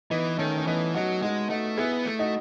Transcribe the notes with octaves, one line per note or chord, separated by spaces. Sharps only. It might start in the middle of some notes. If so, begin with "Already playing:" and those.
E3 B3 D#4
D#3 A3 C#4
C#4
E3 B3 D#4
F#3 D#4 F#4
G#3 D#4 F#4
A3 D#4 F#4
B3 E4 G#4
A3
D#4 F#4